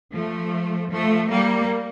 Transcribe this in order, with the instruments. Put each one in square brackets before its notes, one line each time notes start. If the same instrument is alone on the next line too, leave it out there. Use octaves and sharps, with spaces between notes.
[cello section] F3 A3
F3 A3
G3 A#3